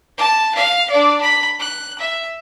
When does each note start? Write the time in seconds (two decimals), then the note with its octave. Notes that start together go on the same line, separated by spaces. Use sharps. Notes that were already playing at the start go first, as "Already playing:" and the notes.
0.18 A5
0.55 F5
0.90 D4 D5
1.22 B5
1.59 F#6
1.99 E5